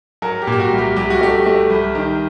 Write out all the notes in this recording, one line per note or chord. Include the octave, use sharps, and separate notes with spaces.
F#3 A#4
G4
A#2
G4
F#4
C2
G4
C2 G4
F#4
A3 G4
A3
C2
D#3